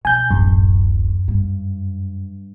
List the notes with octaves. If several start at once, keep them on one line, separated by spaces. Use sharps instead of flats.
B2 G#5 G6
D1 A1 F#2
G2